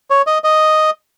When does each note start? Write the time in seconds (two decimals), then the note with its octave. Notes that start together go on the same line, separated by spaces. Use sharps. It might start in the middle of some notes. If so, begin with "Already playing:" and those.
0.10 C#5
0.27 D#5
0.44 D#5